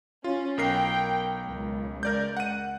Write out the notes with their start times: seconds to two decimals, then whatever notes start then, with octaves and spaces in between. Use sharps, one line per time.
0.24 C#4 F4
0.58 B1 A#4 G5 C7
1.48 C#2
2.03 A#4 D5 G6
2.37 F#5 D#7